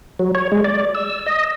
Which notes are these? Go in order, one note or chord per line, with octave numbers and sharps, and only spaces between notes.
F#3
C#5
G#3
D5
E6
D#5